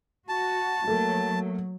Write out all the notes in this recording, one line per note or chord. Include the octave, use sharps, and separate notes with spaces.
F#4 A5
F#3 A3 A#3